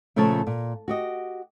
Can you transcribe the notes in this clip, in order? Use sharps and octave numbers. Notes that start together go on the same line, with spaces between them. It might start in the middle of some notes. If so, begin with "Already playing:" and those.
A#2 C#3 F3 A3 C#5 A5
A#2
F#4 G4 D#5